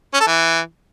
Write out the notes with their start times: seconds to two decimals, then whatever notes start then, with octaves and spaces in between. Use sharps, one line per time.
0.14 C#4
0.20 A4
0.27 E3